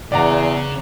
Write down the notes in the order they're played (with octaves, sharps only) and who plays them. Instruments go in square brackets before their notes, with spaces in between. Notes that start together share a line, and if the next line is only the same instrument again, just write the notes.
[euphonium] E2 [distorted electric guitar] C#3 [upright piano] D5 F#5 A#5